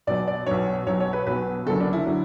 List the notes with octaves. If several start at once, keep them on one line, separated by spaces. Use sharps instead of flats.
B1 B2 F#3 D5
D5
B1 B2 F#3 C#5
B1 B2 F#3 C#5
C#5
B4
B1 B2 F#3 B4
F#1 F#2 D3 F#3 A4
D4
E4
D3 F#3